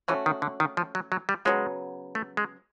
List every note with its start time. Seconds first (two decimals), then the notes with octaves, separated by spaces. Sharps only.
0.08 E3 A3 C#4 F#4
0.26 D#3
0.42 D3
0.60 D#3
0.77 F3
0.95 F#3
1.12 F#3
1.29 G3
1.45 C#3 F#3 G#3 B3
2.15 A3
2.37 G#3